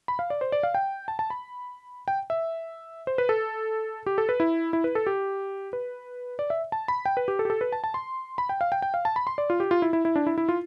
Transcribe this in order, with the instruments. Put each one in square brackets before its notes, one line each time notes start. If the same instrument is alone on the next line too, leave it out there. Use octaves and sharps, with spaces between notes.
[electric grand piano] B5
F5
D5
C5
D5
F5
G5
A5
A5
B5
G5
E5
C5
B4
A4
G4
A4
B4
E4
E4
B4
A4
G4
B4
D5
E5
A5
B5
G5
B4
G4
A4
G4
A4
B4
A5
A5
C6
B5
G5
F5
G5
G5
F5
A5
B5
C6
D5
F4
G4
F4
E4
E4
E4
D4
E4
E4
F4